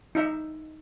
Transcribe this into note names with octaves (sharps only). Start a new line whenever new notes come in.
D#4 E5